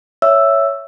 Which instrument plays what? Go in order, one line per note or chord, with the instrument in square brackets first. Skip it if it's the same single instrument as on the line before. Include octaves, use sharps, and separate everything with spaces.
[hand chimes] C#5 E5 E6